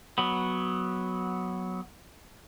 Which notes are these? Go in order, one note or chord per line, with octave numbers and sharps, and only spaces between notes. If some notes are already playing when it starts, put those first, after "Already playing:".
F#3 B3